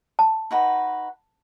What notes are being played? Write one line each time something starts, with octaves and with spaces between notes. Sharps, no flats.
A5
D#4 F#4 B4